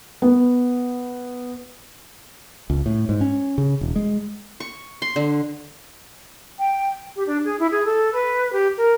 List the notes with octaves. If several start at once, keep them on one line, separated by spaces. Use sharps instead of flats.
B3
C#2
A2
G#2
C#4
C#3
E1
G#3
C#6
C6
D3
G5
G4
D4
G#4
E4
G#4
A4
B4
G4
A#4